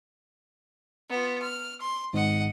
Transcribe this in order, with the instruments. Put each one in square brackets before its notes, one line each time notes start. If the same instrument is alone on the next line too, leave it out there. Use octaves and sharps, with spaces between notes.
[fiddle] B3 F4
F6
C6
[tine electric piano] G#1 G#2 [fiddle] D#5 F#5